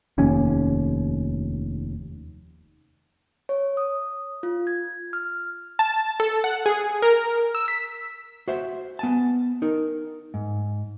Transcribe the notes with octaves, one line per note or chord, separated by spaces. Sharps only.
F1 D#2 C#4
C#5
D#6
F4
G#6
F6
A5
A4
F#5
G#4
A#4
E6
B6
F#4 C5 E5
B3 G#5 A5
D#4 A#4
G#2